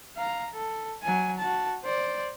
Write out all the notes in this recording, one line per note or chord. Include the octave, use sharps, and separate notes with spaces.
F5 A#5
A4
F#3 G#5
F#4 A5
C5 D5